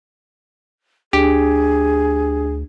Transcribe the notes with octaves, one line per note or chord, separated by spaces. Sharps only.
D2 D4 G4 G#4